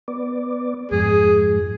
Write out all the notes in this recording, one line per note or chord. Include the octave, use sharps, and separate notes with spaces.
B3 D5
F2 G#2 G#4